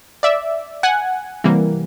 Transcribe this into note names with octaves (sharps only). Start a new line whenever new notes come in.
D5 E5
F#5 G#5
C3 E3 G3 A#3